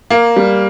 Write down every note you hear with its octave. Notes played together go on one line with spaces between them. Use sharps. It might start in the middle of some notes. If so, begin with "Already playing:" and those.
A#3
G3